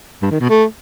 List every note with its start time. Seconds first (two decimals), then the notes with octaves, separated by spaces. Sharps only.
0.22 G2
0.31 D#3
0.40 B2
0.49 A3